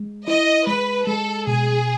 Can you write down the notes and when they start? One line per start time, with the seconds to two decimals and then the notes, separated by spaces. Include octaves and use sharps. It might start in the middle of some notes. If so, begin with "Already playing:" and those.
Already playing: G#3
0.28 E4 D#5
0.67 G#3 B4
1.07 G#3 A4
1.47 B2 G#4